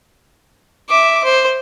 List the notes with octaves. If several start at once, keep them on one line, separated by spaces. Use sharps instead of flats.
E5 D6
C5